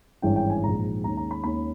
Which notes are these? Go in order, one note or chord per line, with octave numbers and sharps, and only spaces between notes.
G#1 G2 E3 G#3 C#4 G5
G5
G#5
A#1 G#2 D#3 A#5
D#2 D#3 G#3 C#4 A#5
A#5
B5
D#2 D#3 G#3 C#4 B5